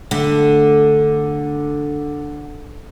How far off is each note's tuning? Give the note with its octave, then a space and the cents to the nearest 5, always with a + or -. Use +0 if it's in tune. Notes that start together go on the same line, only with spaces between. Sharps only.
D3 +0 A3 +0